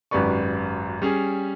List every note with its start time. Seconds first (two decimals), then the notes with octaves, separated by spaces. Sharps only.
0.11 G#1 F#2 G4 B4 D5 C#6
1.02 G3 C#4 G#4